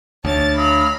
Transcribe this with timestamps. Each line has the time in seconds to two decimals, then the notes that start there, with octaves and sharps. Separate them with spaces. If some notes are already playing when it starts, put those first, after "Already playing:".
0.25 D2 C#5 A5 A6
0.57 F#3 D#5 F5 B5 F6